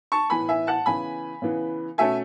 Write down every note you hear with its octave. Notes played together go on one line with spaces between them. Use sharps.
A5 C#6
A2 E3 B3 G#5 B5
E5 G#5
F#5 A5
C#3 E3 B3 G#5 B5
C#3 E3 B3
B2 A3 C#4 E5 G#5